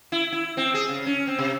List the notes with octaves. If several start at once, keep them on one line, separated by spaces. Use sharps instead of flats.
E4
E4
C4
G#4
C#3
C#4
C4
C3